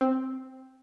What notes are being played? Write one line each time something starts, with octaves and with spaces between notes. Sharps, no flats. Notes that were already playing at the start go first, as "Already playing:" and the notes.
C4